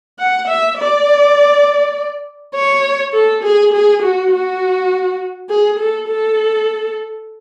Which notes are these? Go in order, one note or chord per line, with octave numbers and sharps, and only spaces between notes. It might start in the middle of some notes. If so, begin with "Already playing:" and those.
F#5
E5
D5
C#5
A4
G#4
G#4
F#4
F#4
G#4
A4
A4